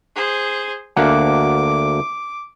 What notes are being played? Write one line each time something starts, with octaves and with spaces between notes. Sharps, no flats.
G#4 C5
D2 A#3 F#5 D6